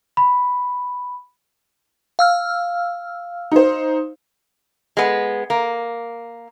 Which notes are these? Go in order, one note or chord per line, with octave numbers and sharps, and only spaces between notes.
B5
F5 E6 F6
D#4 C5
G#3 B3
A#3